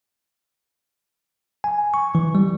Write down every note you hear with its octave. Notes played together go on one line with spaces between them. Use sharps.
G#5
C#6
E3
G3